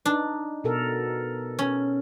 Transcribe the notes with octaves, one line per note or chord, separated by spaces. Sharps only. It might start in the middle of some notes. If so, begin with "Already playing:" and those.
D4 D#4
B2 A4 A#4
C#4